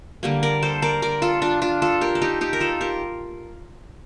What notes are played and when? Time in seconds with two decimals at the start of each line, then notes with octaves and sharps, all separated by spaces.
0.23 D3 G3 A#3
0.43 A#4 D5
0.62 A4 C5
0.82 A#4 D5
1.02 A#4 D5
1.22 F4 A4
1.42 D4 F4
1.62 D4 F4
1.82 F4 A4
2.01 G4 A#4
2.15 A4
2.22 D#4 G4
2.41 D#4 G4
2.53 A#4
2.60 F4 A4
2.81 G4 A#4